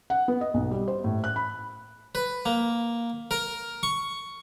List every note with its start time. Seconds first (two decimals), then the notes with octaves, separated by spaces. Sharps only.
0.10 F#5
0.28 B3
0.41 D#5
0.54 B1
0.71 G3
0.88 C5
1.04 A2
1.24 F#6
1.36 B5
2.15 B4
2.46 A#3
3.31 A#4
3.83 C#6